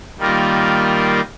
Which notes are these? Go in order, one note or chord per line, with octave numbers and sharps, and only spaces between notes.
D#3 G3 A#3 F4 A#4